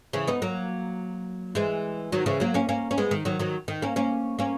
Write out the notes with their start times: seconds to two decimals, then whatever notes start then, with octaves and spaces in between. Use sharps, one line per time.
0.13 C#3 E3
0.28 B3 D#4
0.42 F#3 A#3
1.55 E3 G#3
2.12 D#3 F#3
2.26 C#3 E3
2.40 F#3 A#3
2.54 A#3 C#4
2.69 A#3 C#4
2.91 C#4
2.98 G#3 B3
3.11 D#3
3.25 D#3 F#3
3.39 D#3 F#3
3.68 D#3
3.82 A#3 C#4
3.96 A#3 C#4
4.39 A#3 C#4